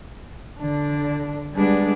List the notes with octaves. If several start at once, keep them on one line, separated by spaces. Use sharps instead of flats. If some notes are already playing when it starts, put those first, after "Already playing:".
D3 D4
G3 G#3 B3 D4